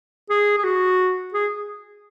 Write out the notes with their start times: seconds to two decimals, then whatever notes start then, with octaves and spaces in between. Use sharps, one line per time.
0.30 G#4
0.58 G#4
0.64 F#4
1.34 G#4